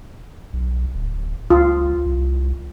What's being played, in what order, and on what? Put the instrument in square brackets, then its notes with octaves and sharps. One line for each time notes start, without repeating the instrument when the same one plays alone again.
[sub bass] B1
D1
[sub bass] C#2 [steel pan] F4
[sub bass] C2